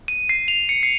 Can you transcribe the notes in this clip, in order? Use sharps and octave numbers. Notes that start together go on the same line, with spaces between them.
D#7
C7
F7
C#7
C7